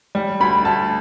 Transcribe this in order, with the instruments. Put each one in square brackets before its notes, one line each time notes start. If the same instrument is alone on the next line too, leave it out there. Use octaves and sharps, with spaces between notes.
[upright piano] G3
D2 B5
D2 A5